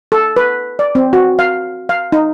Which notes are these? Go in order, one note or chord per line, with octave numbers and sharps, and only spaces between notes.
A4
B4
D5
C4
F#4
F5
F5
D#4